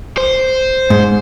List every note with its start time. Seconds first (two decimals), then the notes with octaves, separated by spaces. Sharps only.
0.17 C5
0.90 G#2